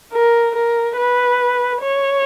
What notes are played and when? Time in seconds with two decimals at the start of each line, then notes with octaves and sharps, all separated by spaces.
0.13 A#4
0.55 A#4
0.97 B4
1.81 C#5